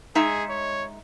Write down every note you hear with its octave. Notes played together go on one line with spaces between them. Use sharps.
G#3 D#4 G#4 E5
C#5